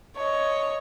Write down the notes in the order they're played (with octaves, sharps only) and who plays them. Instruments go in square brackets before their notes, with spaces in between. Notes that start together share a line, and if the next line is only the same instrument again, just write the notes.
[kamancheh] C#5 D#5